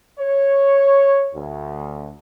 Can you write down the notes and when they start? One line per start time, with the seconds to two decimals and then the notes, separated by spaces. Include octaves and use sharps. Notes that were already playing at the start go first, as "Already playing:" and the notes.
0.20 C#5
1.34 D2